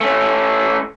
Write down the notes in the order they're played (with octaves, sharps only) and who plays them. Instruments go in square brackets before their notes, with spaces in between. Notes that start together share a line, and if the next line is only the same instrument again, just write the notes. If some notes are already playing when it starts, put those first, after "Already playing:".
[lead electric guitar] A3 C#4